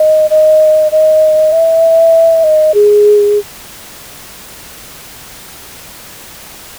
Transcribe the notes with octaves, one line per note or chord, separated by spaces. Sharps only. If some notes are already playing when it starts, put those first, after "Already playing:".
Already playing: D#5
D#5
D#5
E5
D#5
G#4